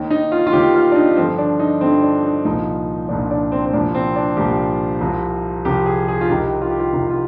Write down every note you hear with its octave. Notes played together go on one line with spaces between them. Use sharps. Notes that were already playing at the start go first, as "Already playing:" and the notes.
Already playing: D#2 D#3
D#4
F4
F4
D#2 D#3 G4
F4
D4
D#4
G2 D3 F3 C4
D4
D#4
G2 D3 F3 C4
D4
D#4
C2 A#2 F3 D#4
C2 A#2 F3 D4
D4
C4
C4
C2 A#2 F3 D4
C4
D4
C2 A#2 F3 G4
C2 C3 F3
C2 C3 F3 G4
G#4
G#4
F4
C2 C3 D#3 G4
F4
G4
F4
C2 C3 D#3
F4